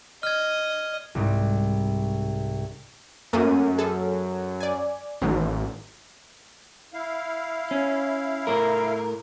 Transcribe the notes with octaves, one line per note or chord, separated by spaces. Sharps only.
D#5 F6 G#6
C2 G#2
F#2 A3 A#3 D#7
G#4 A4
D5 G#5
A1 D#3 F#3 A#3
E4 F5
C#4
A2 A#4